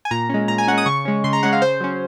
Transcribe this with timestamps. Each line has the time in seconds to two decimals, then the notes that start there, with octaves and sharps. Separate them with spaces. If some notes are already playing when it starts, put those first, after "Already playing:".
0.05 G#5
0.11 A#2 A#5
0.29 G#3 C#4
0.48 A#2 A#5
0.58 G#5
0.68 C#4 F#5
0.72 G#3
0.78 D#6
0.86 C#3 C#6
1.05 G#3 C#4
1.24 C#3 C6
1.33 A#5
1.43 G#3 C#4 F#5
1.53 F5
1.62 C#3 C5
1.80 F#3 C#4